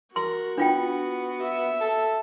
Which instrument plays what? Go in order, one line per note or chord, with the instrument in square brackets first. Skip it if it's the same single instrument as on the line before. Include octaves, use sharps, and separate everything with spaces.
[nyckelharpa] F#4 [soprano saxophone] A#4 [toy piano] C6
[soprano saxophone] B3 [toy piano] D4 F4 G5
[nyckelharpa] E5
[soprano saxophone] A4